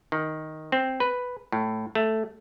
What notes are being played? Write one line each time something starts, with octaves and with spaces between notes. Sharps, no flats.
D#3
C4
B4
A2
A3